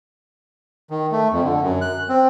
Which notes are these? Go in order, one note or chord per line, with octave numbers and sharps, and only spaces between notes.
D#3
A3
F2
D3
F#2
F#6
C4